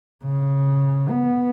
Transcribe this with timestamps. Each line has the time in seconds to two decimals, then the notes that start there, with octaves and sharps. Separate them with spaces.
0.24 C#3
1.09 B3